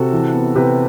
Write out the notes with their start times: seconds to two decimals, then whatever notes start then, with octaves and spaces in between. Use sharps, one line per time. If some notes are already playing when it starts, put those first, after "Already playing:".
Already playing: C3 F#4 A4
0.12 E3
0.34 B3
0.55 C3 G4 B4